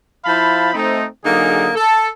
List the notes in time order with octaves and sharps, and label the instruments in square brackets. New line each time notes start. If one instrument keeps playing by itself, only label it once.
[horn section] F3 E4 C5 F5 A5 B5
A3 C4 D#4
D3 F#3 A#3 D#4 G#4
A4